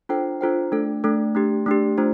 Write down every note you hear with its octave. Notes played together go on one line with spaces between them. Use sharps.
D4 F4 A4 C5 G5
D4 F4 A4 C5 G5
A3 D4 A4
A3 D4 A4
A3 D4 G4
A3 D4 G4
A3 D4 F4 C5